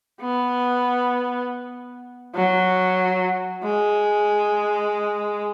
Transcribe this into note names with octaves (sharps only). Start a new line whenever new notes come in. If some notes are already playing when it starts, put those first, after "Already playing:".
B3
F#3
G#3